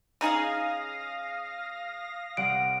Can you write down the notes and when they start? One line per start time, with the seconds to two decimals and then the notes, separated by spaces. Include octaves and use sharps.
0.21 C#3 D#4 G#4 F5 D#6 A#6
2.37 C2 F#5 D7